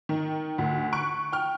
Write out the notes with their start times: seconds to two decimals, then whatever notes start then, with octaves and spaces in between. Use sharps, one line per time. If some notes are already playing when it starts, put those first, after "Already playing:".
0.09 D#3
0.58 D2
0.93 C#6 F#6 D7
1.33 G5 F6